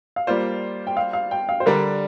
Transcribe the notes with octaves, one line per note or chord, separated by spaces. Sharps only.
F5
G3 A#3 F4 C5 D5
G5
F5
F5
G5
F5
C5
D3 G3 D4 A#4